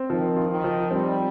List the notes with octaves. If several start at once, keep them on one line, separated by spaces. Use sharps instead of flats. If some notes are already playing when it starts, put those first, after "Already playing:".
Already playing: C4
D#3 F3
F4
D#3
F3
G3 C4